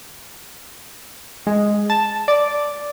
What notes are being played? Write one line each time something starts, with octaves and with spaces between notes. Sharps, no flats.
G#3
A5
D5